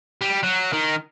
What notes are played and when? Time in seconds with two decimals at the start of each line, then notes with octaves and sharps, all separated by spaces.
0.21 G3
0.44 F#3
0.73 D#3